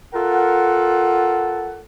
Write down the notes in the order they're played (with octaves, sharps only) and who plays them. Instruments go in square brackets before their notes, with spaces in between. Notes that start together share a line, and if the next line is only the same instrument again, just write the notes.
[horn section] F4 A4 A#4 F#5